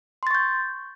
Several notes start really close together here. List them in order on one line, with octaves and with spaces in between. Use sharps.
C6 A6 C#6 G6